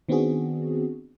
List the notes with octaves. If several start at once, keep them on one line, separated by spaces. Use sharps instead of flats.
D#3 B3 C4 D4 F#4 G#4